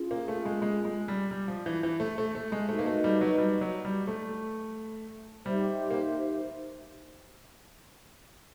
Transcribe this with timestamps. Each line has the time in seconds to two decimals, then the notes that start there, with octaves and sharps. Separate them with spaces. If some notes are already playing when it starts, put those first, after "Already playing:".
Already playing: C#4 F4 G#4
0.11 A#3
0.28 A3
0.46 G#3
0.62 G#3
0.85 G#3
1.08 G3
1.31 G3
1.48 F3
1.66 E3
1.83 E3
2.00 A3
2.18 A3
2.35 A3
2.52 G#3
2.69 A3 D#4 F#4 B4 D#5
2.79 A#3
2.86 A3
3.04 G3
3.21 F#3
3.38 G3
3.61 F#3
3.85 G3
4.07 A3
5.45 G3 D#4 G4 C5 E5
5.91 A#3